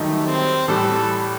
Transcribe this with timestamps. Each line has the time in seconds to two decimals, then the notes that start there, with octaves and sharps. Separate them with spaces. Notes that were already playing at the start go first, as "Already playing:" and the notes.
Already playing: F#2 D#3 G3 A3 D#4 G4
0.27 C4
0.68 A2 E3 G3 A4